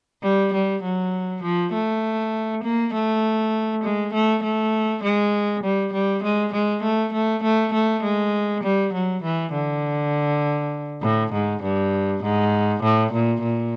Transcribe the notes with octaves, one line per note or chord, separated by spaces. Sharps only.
G3
G3
F#3
F3
A3
A#3
A3
G#3
A3
A3
G#3
G3
G3
G#3
G#3
A3
A3
A3
A3
G#3
G3
F#3
E3
D3
A2
G#2
G2
G#2
A2
A#2
A#2